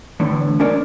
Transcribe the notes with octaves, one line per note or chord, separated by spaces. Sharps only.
E2 A2 D3
C#4 D4 A#4 C#5 D5